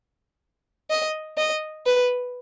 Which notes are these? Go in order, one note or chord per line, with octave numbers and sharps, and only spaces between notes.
D#5
D#5
B4